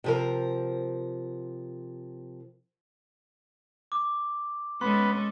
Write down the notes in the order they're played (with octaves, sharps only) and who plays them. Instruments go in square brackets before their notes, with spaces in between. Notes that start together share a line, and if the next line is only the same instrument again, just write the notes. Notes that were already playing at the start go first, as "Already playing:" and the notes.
[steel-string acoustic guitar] C3 F3 A#4
[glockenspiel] D6
[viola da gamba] G#3 C#4 A4 [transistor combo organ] B3 [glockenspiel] C6